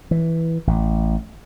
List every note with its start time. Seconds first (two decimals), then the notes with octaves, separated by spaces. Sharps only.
0.11 E3
0.67 A1